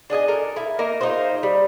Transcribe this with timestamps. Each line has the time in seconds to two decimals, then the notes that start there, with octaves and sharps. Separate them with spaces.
0.10 D4 G#4 D#5 G#5
0.28 A4 A#4
0.56 E4
0.79 A#3 D#4 A#4
1.01 D#4 F4 G#4 C5
1.43 G3